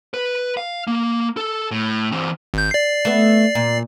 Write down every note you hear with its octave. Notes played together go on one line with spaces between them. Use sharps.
B4
F5
A#3
A4
A2
E3 C4
G#1 G6
D5 C7
A3 B3
A#2